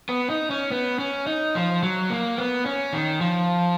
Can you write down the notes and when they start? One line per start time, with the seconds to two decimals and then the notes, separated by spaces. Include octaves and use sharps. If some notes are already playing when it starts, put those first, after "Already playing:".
0.09 B3
0.30 D#4
0.50 C#4
0.72 B3
0.99 C#4
1.27 D#4
1.55 F3
1.83 F#3
2.10 A#3
2.38 B3
2.66 C#4
2.93 D#3
3.21 F3